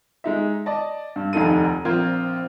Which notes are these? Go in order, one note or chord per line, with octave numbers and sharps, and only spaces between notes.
G#3 D#4 E5
D5 D#5 A5
G2
F1 D#2 D#4 A4 D#7
A#1 C4 F4 A#4 C5 G#6